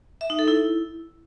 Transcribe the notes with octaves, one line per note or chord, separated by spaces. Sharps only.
E5
D#4
A4
E4